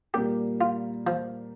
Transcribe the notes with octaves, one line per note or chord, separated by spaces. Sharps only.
A#2 G3 A#3 G4
F4
F3